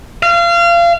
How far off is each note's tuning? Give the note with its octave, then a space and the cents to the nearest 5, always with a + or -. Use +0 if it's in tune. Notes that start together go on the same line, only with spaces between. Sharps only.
F5 -30